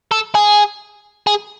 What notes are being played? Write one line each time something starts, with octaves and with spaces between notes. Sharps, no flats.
A4
G#4
G#4